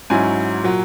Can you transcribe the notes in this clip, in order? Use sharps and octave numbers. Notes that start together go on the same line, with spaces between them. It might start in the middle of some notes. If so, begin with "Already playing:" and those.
G#2 F#3 C#4 E4 G#5
A#2 F#3